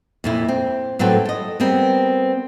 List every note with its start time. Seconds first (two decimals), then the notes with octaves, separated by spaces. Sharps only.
0.24 F2 A#2 E4
0.48 C4
0.99 A2 F#3 G3 C4 A4 B4
1.26 A4 D#5
1.60 G3 B3 C4 A#4